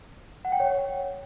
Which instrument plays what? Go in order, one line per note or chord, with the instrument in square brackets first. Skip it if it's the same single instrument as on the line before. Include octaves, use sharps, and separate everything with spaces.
[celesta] F#5
G5
C#5